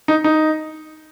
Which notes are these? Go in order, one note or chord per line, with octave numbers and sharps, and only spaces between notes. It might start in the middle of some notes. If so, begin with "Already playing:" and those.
D#4
D#4